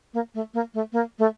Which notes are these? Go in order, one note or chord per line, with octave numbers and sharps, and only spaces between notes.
A#3
A3
A#3
A3
A#3
A3